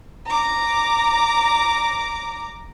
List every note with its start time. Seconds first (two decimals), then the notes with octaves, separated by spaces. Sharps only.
0.26 A#5 D6